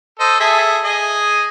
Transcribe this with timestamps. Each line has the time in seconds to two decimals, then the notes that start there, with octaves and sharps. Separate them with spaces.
0.20 A4 C5 D#5
0.40 G#4 A4 E5
0.84 G#4 D#5